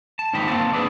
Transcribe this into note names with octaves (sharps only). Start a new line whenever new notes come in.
A5
D#2 G#2 D#3 C4 G4 B5
A#3 C4 A5
D4 E4 G#4 B4 D5